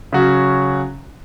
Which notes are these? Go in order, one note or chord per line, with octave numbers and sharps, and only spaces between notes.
C#3 F#3 C#4 F#4